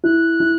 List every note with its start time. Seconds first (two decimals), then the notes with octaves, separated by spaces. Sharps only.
0.04 E4 F#6
0.40 E4